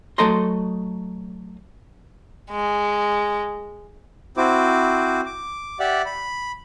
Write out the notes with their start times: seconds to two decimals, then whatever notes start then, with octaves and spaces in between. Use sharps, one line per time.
0.18 F#3 A3 A4 D#5 A#5 C6
2.50 G#3
4.37 C4 E4 F#4 C5 D6
5.25 D6
5.80 G4 D5 E5 F#5
6.06 B5